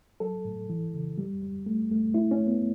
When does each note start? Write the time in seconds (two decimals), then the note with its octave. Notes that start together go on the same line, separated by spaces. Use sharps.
0.20 F#3 A4
0.45 A2
0.70 E3
0.94 C#3
1.18 G3
1.42 G3
1.66 A3
1.91 A3
2.14 A3 E4
2.31 C#4
2.39 A3
2.47 B3